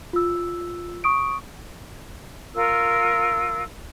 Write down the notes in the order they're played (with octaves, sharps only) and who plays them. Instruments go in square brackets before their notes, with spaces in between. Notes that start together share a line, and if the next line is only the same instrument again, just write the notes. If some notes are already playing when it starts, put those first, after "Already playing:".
[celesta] F4 E6
C#6 D#6 D7
[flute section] F4 A#4 E6